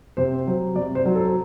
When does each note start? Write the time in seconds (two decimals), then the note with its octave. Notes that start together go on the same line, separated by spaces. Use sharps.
0.17 C3 C5
0.47 F#3
0.76 C3 D5
0.95 C5
1.06 F#3
1.15 A4